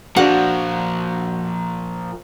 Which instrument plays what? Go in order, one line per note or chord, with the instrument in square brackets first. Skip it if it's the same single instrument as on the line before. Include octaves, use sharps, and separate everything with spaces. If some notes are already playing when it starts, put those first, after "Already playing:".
[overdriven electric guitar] A#2 F3 [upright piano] D4 F#4 [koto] F#5